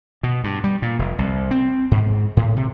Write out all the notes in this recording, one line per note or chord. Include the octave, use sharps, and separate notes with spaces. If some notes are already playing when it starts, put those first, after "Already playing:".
B2
G2
G3
A#2
F1
C2
C4
G#2
A2
C3